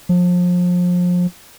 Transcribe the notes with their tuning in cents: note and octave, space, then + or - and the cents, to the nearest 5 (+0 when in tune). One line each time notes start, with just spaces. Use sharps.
F3 +30